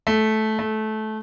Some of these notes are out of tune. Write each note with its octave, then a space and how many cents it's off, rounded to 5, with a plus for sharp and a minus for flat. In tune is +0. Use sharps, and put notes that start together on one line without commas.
A3 -15
A3 -20